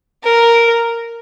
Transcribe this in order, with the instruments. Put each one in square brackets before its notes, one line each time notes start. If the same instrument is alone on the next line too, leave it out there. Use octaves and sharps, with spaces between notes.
[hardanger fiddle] A#4